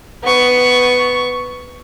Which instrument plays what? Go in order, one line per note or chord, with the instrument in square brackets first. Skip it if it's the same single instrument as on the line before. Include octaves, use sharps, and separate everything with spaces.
[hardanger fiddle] B3 C#6